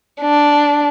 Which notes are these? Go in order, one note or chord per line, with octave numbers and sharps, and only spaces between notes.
D4